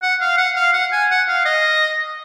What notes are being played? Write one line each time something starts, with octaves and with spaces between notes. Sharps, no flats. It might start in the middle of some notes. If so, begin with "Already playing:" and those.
F#5
F5
F#5
F5
F#5
G#5
F#5
F5
D#5